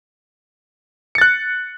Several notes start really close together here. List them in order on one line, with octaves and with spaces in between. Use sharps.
C#7 A6 F#6